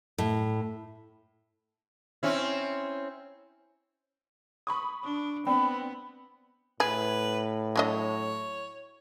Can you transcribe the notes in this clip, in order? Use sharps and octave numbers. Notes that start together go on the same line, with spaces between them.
A2
C4 C#4 E4
B5 C#6 D#6
D4
B3 C4 D4 B5
A2 G#4 B4
F#3 D4 C#5 D#5